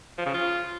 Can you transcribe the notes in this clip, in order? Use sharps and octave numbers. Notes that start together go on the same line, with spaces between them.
F3
C#3
F4